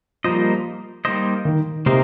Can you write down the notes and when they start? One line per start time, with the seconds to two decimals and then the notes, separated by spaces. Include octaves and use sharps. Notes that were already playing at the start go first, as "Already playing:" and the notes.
0.24 F3 G3 A#3 D#4 C5 D#5
1.05 G3 A#3 D#4 C5 D#5
1.45 D#3
1.86 C3 A#3 D#4 C5 D#5